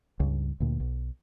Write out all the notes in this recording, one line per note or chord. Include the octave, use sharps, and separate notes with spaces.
C#2 G2
D2 A#2
B1